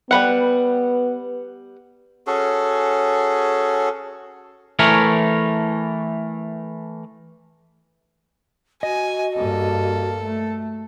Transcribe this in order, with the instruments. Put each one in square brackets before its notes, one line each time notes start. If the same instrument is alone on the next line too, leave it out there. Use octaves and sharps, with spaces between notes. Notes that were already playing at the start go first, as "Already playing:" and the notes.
[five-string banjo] G3 B4 F#5 [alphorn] B3
[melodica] C#4 F#4 G#4 A4
[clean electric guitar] E3 A3 A#4 C#5
[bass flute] F#4 [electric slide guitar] D#5 [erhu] G#5
[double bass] G2 A#3 [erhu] A4
[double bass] A3